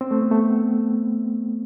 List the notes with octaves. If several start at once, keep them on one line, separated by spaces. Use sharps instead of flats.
C4
A3
B3
A3